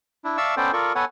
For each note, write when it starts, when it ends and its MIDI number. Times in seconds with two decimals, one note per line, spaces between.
0.24 0.37 62
0.24 0.37 64
0.37 0.55 74
0.37 0.55 76
0.37 0.55 77
0.37 0.55 81
0.37 0.55 85
0.37 0.55 88
0.57 0.72 59
0.57 0.72 61
0.57 0.72 69
0.57 0.72 72
0.57 0.72 74
0.57 0.72 79
0.73 0.93 65
0.73 0.93 69
0.73 0.93 70
0.73 0.93 74
0.73 0.93 85
0.95 1.05 59
0.95 1.05 69
0.95 1.05 71
0.95 1.05 73
0.95 1.05 78
0.95 1.05 80